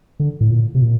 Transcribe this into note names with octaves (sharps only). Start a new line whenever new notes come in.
D3
A2
A#2
C3
A#2